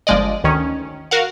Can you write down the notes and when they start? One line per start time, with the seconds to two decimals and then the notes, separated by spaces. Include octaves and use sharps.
0.07 G1 F3 G#3 D5 D#5
0.44 D2 D#3 C#4
1.11 F#4 A#4 F5 F#5